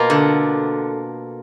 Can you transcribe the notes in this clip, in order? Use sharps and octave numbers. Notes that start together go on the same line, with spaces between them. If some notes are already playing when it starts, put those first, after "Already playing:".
Already playing: B2 A#3 F4
D3